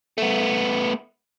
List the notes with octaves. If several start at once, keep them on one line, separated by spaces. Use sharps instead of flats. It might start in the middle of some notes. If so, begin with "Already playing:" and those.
A3 B3